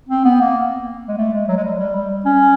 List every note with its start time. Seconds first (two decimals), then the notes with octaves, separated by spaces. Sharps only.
0.09 C4
0.24 B3
0.41 A#3
1.08 G#3
1.18 A3
1.33 G#3
1.48 F#3
1.57 G#3
1.64 G3
1.79 G3
1.95 G3
2.25 C#4